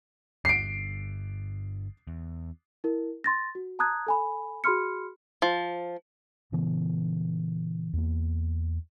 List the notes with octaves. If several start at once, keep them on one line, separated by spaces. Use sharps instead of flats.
G1 G2 C7 D7
E2
E4 A#4
C6 A6 A#6
F#4
A5 A#5 D#6 F#6 G#6
A4 G#5 B5
F#4 G#4 B5 C6 F6 C#7
F3
A#2 C#3 E3 B3
E2 A#3